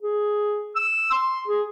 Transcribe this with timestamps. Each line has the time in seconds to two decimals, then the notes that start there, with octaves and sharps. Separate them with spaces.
0.02 G#4
0.75 E6
1.11 C6
1.47 G#4